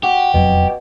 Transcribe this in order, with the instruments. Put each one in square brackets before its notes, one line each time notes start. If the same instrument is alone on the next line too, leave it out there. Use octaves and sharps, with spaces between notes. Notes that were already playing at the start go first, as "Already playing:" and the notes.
[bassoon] F#4 [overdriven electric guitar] G4
[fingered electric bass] E1 F2 F#3 [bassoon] B2